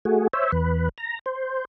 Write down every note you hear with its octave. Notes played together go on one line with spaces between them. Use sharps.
A3 F#4 G#4
C5 C#5 E5
E2 B4
A#5
C5